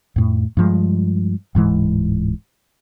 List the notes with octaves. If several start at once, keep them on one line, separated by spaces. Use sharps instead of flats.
F2 A2
G2 F3 G#3
D1 G#2 E3 G#3